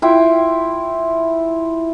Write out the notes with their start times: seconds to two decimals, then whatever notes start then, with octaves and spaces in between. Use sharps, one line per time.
0.02 E4 F4 G5